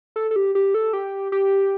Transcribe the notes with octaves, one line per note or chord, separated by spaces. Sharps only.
A4
A4
G4
G4
A4
G4
G4